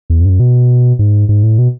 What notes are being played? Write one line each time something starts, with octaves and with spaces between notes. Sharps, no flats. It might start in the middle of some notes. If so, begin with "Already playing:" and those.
E2
F2
G2
F#2
B2
G#2
G#2
A2
B2